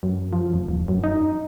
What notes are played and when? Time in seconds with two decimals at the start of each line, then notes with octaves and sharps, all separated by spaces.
0.03 F#2
0.33 F3
0.53 F1
0.68 D#1
0.88 F#2
1.04 D#4